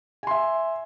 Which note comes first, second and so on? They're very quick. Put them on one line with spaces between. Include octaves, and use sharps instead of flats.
G#5 C6 E5